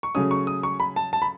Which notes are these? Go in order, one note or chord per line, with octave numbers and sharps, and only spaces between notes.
C#6
C#3 F#3 A3 C#4 D#6
C#6
D#6
C#6
B5
A5
A5
B5